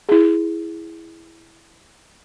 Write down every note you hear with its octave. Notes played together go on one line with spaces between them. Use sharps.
E4 G#4